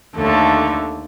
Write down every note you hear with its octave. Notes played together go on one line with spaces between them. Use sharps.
D#2 D3 A3